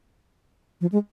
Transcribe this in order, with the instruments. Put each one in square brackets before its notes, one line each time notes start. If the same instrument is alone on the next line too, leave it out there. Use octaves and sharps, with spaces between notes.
[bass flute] F3
G#3